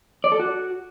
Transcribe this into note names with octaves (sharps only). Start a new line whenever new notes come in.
D5
A4
F#4